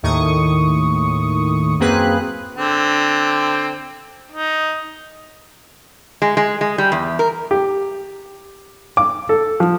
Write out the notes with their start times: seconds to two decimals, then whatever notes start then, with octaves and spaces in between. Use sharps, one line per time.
0.03 D#2 A2 D#3 C#6 D#6
1.79 F#2 A#3 C4 G#4 B4 F#6
2.55 D3 C4
4.32 D#4
6.22 G#3
6.37 G#3
6.61 G#3
6.78 G3
6.92 E2
7.19 A#4
7.51 G4
8.97 D6
9.29 A4
9.60 F3